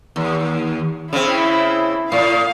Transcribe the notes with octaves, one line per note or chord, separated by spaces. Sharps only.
D#2
C#3 C4 E4
A2 F5